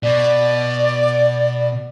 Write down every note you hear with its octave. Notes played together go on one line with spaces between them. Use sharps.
B2 D5